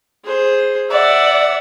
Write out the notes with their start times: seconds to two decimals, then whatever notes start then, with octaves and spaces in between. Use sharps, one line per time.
0.24 G#4 C5
0.90 D5 E5 F#5